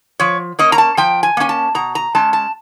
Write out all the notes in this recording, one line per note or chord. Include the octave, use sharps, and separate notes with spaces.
F3 C#5
A#3 C#4 D#5
A#5
A5
F3 G5
G#5
A#3 C#4 G#5
A5
B2 A#5
A#5
G#3 C#4 A5
A5